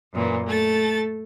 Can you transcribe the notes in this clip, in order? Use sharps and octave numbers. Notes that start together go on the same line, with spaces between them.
F#2 A#2 E3
A3 A4 A6